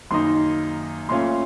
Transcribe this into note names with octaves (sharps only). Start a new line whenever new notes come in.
F#2 D#3 A#3 D#4 C6
A#2 A3 C#4 F4 C6